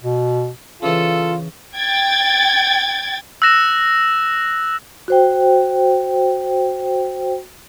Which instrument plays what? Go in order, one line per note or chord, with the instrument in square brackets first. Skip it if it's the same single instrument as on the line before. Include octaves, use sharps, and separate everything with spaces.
[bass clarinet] B2
[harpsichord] C#3 E3 C5 [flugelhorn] F4 [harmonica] A4
[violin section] G5 G#6 A6
[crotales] E6 F#6 A#6 E7
[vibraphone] F#4 C5 G5